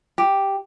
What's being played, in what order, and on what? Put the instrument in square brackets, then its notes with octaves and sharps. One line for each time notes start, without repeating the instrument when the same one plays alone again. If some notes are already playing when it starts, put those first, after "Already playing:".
[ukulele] G4